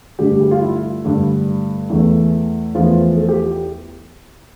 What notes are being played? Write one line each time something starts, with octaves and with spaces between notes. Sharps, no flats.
G2 D3 G3 A3 G4
G4
F4
E4
G2 D3 A3
E2 E3 A3
E2 E3 F3 A3 F4
A4
G4